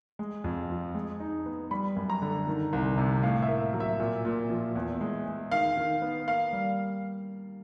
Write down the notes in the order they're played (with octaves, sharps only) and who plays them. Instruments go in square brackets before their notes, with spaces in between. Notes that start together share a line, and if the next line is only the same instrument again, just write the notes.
[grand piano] G#3
F2
F3
G#3
D#4
B3
[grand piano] G3 [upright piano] B5
[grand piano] F#2
[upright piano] A#5
[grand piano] D3
D#3
C2
C3
[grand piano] A2 [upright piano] F5
[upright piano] E5
[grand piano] A#3
F#3
[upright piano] E5
[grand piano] A#2
A#2
F3
E2
G#3
G#3
[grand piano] D#3 [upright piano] F5
[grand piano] D#3
B3
[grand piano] A#3 [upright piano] F5
[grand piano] G3